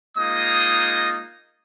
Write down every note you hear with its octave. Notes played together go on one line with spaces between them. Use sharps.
G#3 A#3 D#4 F4 D#5 D#6